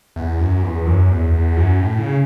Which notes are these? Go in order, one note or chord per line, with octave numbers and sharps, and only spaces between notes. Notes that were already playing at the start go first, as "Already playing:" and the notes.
E2
F#2
E2
F#2
E2
E2
F#2
A2
C#3